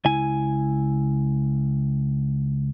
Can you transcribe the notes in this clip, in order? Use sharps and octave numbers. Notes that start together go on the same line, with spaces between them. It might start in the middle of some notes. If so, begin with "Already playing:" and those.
C#2 E4 G#5